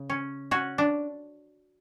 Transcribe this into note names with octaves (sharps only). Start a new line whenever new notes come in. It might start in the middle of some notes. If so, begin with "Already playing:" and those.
Already playing: C#3
C#4
C#4 F#4
D4